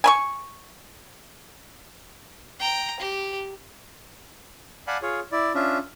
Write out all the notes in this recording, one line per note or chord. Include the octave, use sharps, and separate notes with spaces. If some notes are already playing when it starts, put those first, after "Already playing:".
G#5 B5 C#6
G5 A#5
G4
D5 F5 F#5 G#5 A5 B5
F4 G#4 C#5
E4 D5
C#4 D4 F4 E5